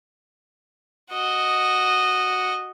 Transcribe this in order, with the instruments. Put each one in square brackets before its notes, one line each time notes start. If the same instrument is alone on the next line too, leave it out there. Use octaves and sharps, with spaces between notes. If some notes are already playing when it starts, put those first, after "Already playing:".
[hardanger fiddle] F#4 D#5